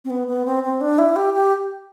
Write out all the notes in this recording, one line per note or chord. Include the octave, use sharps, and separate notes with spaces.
C4
B3
B3
C4
C4
D4
E4
G4
G4